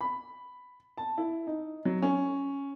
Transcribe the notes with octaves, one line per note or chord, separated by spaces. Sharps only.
B5
A5
E4
D#4
F#3
C#4